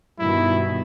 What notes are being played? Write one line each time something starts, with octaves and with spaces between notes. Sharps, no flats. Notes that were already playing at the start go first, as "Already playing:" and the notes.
G2 B2 D#3 E4